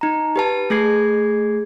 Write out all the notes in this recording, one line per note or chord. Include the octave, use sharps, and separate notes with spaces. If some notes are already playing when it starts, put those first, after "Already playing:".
D#4 A#5
G4 B4 A5
A3 G#4 G#6 C7